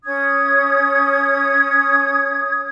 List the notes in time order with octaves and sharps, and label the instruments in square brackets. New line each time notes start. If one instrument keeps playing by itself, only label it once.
[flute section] C#4 D#6 G#6